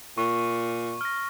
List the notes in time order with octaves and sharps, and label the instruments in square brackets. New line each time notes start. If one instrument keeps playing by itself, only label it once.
[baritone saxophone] A#2 [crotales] C#6
[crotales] F6 A#6